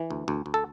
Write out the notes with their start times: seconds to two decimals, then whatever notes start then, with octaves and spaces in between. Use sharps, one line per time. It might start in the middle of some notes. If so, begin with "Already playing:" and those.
Already playing: E3
0.11 D2
0.28 D2
0.46 D2
0.54 A4